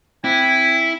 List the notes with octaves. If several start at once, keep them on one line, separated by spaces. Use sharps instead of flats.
C4 E4 G#5 B6